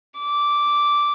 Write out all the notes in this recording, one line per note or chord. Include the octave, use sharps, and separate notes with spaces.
D6